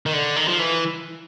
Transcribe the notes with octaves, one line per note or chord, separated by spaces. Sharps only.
D#3
D3
D#3
F3
E3